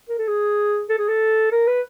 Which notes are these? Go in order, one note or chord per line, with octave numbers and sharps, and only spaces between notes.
A#4
A4
G#4
A4
G#4
A4
A#4
B4